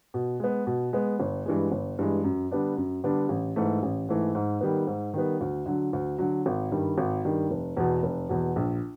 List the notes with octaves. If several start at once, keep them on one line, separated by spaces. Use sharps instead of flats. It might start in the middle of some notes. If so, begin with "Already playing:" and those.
B2
G#3 B3
B2
G#3 B3
G1
G2 E3 G#3
G1
G2 E3 G#3
F#2
D3 G3 B3 D4
F#2
D3 G3 B3 D4
A1
G#2 E3 A3
A1
G#2 E3 A3
G#2
D#3 G3 B3
G#2
D#3 G3 B3
D2
D3 F#3
D2
D3 F#3
G#1
G2 D#3 G3
G#1
G2 D#3 G3
F1
E2 B2
F1
E2 B2
A#1